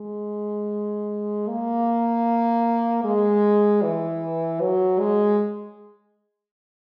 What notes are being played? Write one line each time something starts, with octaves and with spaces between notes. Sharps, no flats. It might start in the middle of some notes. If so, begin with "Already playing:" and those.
Already playing: G#3
A#3
G#3
E3
F#3
G#3